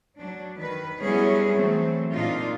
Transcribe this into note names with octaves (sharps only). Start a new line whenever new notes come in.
F#3 D4
D#3 B4
F#3 G3 B3 C#4 E4 G#4
E3 F#3 A3 C4
A#2 D4 D#4 F4